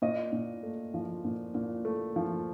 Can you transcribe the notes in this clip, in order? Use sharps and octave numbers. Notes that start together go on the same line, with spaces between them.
A#2 D#5
A#2
A3
F3
A#2
A#2
A3
F3